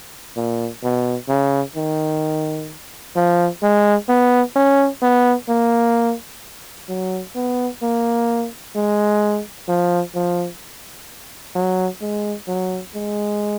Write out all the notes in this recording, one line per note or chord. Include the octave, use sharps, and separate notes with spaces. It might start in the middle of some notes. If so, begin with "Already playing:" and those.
A#2
B2
C#3
D#3
F3
G#3
B3
C#4
B3
A#3
F#3
B3
A#3
G#3
F3
F3
F#3
G#3
F#3
G#3